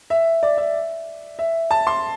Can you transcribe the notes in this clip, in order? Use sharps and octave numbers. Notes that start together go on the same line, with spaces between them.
E5
D5
E5
E5
A5
C6